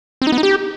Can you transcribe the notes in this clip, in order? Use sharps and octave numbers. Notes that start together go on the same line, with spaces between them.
C4
D#4
B3
D#4
G4